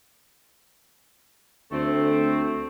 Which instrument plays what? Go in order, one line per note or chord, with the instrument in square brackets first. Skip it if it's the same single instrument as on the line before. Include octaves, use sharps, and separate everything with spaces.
[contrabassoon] D2 [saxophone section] A3 C4